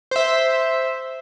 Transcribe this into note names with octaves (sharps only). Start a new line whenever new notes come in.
C5 E5